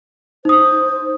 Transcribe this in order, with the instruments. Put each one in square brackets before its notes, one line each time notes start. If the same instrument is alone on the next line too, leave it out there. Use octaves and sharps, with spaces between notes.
[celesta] D#4 D#6 [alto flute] C5